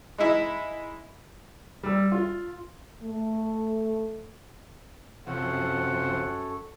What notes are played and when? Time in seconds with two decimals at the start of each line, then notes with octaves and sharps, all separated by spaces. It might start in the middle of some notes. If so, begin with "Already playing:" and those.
0.18 G#3 D#4 E4
1.83 G3 E6
2.12 F4
3.03 A3
5.27 F#2 C3 F3 A4 C#5 F#5